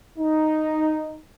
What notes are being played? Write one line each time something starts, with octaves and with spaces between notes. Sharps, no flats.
D#4